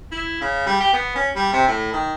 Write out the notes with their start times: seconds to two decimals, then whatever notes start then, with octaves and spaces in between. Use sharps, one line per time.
0.12 E4
0.41 C#3
0.67 G3
0.80 G4
0.93 B3
1.16 C#4
1.36 G3
1.53 C3
1.68 A2
1.93 D#3